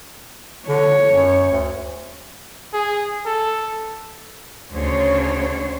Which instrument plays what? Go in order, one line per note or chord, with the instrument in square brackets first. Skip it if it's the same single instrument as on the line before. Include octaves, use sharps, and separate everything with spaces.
[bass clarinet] D3 [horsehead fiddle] C#5
[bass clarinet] F#2
D2
[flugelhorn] G#4
A4
[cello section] D2 C#3 C5 C#5